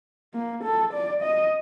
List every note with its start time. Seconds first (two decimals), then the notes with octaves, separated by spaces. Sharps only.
0.34 A#3
0.64 A4
0.93 D5
1.22 D#5